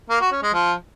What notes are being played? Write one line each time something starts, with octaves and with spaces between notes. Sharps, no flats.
A#3
F#4
C#4
G#3
F3